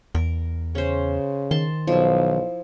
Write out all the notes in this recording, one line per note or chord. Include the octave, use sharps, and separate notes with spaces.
E2 A#4
C#3 C#4 C5
D#3 A5 C6
B1 F3 E4